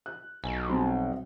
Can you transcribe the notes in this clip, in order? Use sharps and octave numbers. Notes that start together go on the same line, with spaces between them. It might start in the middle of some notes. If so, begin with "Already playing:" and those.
F#6
B1 G#5
B2 G3 C4